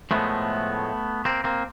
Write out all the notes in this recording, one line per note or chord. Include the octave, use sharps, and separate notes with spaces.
A2 F3 G#3 A3 B3
A#3 C4
A#3 C4